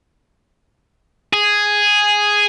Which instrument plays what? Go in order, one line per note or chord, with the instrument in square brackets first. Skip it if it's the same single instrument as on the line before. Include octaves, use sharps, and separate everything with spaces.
[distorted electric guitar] G#4